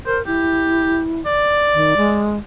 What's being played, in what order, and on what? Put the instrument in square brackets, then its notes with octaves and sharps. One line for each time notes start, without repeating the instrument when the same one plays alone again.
[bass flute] A#4 [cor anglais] C5
[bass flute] E4 [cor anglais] G4
[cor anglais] D5
[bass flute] D#3
G#3